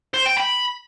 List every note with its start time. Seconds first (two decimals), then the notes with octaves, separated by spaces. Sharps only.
0.14 C5
0.26 G5
0.38 B5